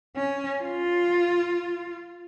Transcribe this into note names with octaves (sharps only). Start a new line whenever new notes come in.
C#4
F4